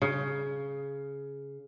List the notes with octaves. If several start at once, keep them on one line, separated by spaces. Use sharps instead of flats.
C#3